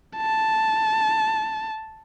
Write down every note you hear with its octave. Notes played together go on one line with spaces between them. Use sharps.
A5